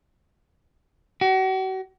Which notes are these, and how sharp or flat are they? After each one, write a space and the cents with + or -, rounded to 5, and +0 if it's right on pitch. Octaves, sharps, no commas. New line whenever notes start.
F#4 +40